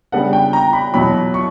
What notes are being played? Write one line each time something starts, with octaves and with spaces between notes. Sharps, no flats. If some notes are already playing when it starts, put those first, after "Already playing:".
C#3 G3 B3 D4 F#5
G5
A#5
B5
E2 B2 F#3 B5
C#6